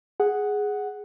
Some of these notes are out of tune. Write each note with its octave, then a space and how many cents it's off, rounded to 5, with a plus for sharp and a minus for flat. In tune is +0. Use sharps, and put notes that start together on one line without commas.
G#4 +0 F#5 +0